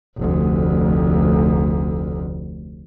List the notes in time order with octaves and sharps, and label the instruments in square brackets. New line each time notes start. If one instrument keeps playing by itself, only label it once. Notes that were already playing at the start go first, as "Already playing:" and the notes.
[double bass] F1 D2